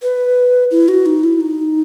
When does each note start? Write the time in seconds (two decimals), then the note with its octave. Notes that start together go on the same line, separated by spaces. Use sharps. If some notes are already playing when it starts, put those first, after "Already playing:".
0.02 B4
0.71 E4
0.88 F#4
1.06 D#4
1.23 E4
1.40 D#4